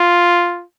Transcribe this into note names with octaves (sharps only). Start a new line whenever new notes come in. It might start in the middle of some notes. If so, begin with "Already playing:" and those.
Already playing: F4